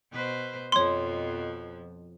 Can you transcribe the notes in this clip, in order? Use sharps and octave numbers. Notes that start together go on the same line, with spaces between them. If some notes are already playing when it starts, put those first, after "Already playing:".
B2 B4 C5
F2 B2 F3 C#5 C6